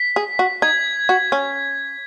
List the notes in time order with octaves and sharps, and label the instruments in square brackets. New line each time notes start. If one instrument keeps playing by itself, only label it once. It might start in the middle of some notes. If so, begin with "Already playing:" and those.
Already playing: [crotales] B6
[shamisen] G#4
F#4
[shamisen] D#4 [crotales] G#6
[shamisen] F#4
C#4